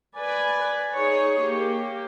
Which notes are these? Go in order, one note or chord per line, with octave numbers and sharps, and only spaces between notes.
B4 D5 G#5
D#4 G#4 C#5
A#3 G4